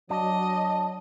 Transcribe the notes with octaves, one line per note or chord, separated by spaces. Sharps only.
F#3 D4 D#5